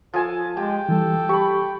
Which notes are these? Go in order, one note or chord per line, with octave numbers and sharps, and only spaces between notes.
F3 A4 G#5 A5
G#3 G4 G5
E3 G3 A4
G4 B5 C#6